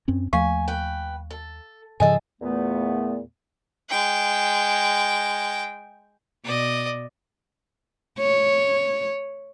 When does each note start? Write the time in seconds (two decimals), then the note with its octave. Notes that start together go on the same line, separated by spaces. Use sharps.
0.08 F#2 C4 C#4
0.33 D#2 F3 A3 F5 G#5 C#6
0.68 B4 G5
1.30 A4
2.00 G#2 C#3 F3 G#4 A4 D#5 G#5
2.41 E2 A#2 A3 B3
3.89 G#3 G5
6.44 B2 D5 D#5
8.19 C#5